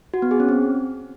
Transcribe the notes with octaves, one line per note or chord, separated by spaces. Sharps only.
F#4
B3
G#4
C#4
C4